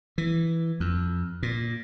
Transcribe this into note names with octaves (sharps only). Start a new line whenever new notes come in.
E3
F2
A#2